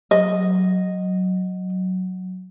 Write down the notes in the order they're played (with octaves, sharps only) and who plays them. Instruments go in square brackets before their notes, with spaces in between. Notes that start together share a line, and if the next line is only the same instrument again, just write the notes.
[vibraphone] F#3 [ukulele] D#5